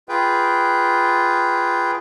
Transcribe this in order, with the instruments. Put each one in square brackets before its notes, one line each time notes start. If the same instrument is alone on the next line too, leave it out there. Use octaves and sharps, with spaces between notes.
[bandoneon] F4 G#4 B4 G5